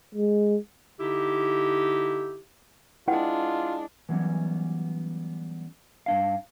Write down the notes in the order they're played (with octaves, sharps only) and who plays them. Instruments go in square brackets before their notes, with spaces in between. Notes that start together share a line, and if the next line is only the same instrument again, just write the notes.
[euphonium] G#3
[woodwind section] D3 D#4 E4 G4
[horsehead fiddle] G#3 D4 [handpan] E4 [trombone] F4 [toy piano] B4 F#5 G5
[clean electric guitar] E3 F#3 G3 A3 B3 C#4
G2 D4 F5